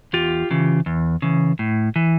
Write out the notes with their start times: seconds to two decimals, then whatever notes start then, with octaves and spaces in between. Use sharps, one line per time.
0.13 E2 F4 G4
0.51 C#3 E3
0.86 E2
1.22 C#3 E3
1.59 A2
1.96 E3